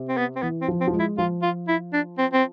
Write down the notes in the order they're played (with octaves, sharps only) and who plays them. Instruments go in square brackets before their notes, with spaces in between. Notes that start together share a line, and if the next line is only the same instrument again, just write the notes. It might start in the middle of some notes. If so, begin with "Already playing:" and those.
Already playing: [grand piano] C3
[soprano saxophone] C4
B3
C4
[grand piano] E3 [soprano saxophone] B3
[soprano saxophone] C4
[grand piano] F3
[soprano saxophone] C4
[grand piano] F3
G#3
[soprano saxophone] E4
[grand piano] F3 [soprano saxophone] F4
[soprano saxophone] F4
E4
D4
C4
C4